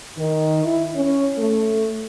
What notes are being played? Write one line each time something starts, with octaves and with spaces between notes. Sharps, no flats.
D#3
E4
C#4
A3